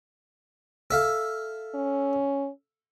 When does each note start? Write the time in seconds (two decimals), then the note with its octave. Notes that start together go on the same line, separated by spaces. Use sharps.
0.91 A4 E5 F5
1.75 C#4